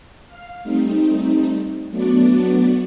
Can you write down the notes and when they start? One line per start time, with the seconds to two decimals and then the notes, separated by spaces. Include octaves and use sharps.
0.28 F5
0.63 G3 A3 C4 D#4
1.89 F#3 A3 B3 D4 F#4 D5